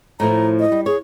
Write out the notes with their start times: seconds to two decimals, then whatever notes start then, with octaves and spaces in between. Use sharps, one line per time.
0.20 A2 F3 A3 A#5
0.60 D#5
0.72 G3
0.86 G#4 C#5